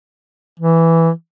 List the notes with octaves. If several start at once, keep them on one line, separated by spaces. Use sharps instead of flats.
E3